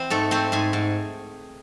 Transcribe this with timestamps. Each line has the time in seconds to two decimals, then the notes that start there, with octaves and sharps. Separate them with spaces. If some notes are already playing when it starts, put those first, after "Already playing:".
Already playing: E3 C4 C5
0.10 G#2 A3 A4
0.31 A3 C4 C5
0.52 G#2 G#4 G#5
0.73 G#2